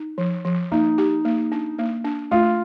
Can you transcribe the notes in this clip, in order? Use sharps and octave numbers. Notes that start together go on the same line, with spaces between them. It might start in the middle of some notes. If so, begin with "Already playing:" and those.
Already playing: D#4
F3
F3
A#3 D#4
G4
A#3
D4
A#3
D4
A3 F4